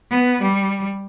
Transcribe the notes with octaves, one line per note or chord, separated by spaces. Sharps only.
B3
G3